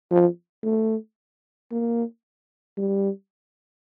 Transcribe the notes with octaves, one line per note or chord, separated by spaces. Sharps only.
F3
A3
A#3
G3